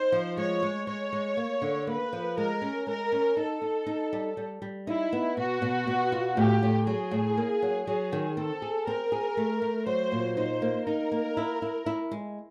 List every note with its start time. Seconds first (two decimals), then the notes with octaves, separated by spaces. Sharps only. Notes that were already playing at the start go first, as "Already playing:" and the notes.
Already playing: D#4 C5
0.12 F3
0.37 G#3 C#5
0.63 G#3
0.87 G#3 C#5
1.13 G#3
1.37 A#3
1.62 D3
1.87 A#3 B4
2.13 F3
2.37 G#3 A#4
2.62 C#4
2.87 G#3 A#4
3.12 C#4
3.37 D#4 A4
3.62 D#4
3.86 D#4
4.13 G3
4.37 G3
4.62 G3
4.87 D#4 E4
5.13 B3
5.37 B2 F#4
5.62 B2
5.87 B2
6.12 F4
6.36 A2 G4
6.63 A2
6.87 F#3 G#4
7.11 A2
7.37 A#3
7.62 F#3
7.86 F#3 G#4
8.12 D#3
8.37 C4 A4
8.62 G#4
8.86 C4 A#4
9.12 G#4
9.37 A3
9.62 A3
9.86 F#3 C5
10.12 A#2
10.37 D#4 C5
10.62 A#3
10.86 D#4 A#4
11.12 A#3
11.37 E4
11.62 E4
11.86 E4
12.11 G#3